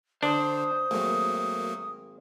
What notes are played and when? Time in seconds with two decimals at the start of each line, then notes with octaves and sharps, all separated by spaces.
0.23 D3 D4 C5 C6 D#6
0.91 G#1 F#3 A3 A#3